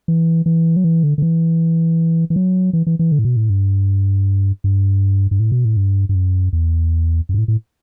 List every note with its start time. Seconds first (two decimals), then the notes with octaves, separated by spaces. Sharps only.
0.08 E3
0.46 E3
0.76 F#3
0.84 E3
1.03 D3
1.18 D3
1.22 E3
2.30 E3
2.36 F#3
2.73 E3
2.87 E3
2.99 E3
3.12 D3
3.19 A2
3.25 B2
3.36 A2
3.50 G2
4.64 G2
5.31 G2
5.40 A2
5.52 B2
5.65 A2
5.77 G2
6.09 G2
6.15 F#2
6.53 E2
7.29 F#2
7.34 G2
7.38 A2
7.48 A2